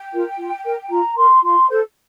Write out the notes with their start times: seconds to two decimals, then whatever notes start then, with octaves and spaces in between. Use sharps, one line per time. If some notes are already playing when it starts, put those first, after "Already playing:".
Already playing: G5
0.12 F4 A#4
0.38 F4
0.64 A#4
0.90 F4 A#5
1.16 A#4 C6
1.43 F4 C6
1.69 A4 C5